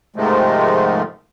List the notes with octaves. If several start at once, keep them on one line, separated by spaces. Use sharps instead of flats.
G#2 C3 D#3 F3 G#3 A3